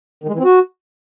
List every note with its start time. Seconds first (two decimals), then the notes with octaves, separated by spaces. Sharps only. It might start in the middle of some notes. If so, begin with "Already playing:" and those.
0.24 D#3
0.29 G#3
0.34 E3
0.39 C4
0.44 F#4